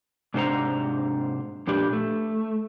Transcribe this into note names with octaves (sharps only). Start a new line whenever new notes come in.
G#2 C3 D4 C5 F#5 A#5
F2 A#2 D4 G4 B4
A3